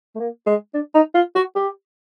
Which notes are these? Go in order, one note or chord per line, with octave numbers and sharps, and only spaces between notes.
A3
A#3
G#3
D4
D#4
F4
F#4
G4